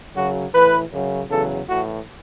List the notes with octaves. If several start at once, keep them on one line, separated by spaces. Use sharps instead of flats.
F#2 C#3 F#3 F#4
A2 E3 B4
F#2 C#3 F#3
E2 C#3 F#3 A4
A2 E3 F#4